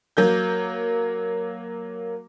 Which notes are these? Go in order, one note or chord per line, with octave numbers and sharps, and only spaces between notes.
F#3 A#3 G6